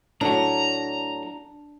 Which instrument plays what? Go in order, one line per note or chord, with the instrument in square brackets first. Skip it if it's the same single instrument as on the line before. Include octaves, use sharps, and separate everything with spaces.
[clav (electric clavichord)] A2 F#3 [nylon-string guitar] D4 [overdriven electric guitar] A#5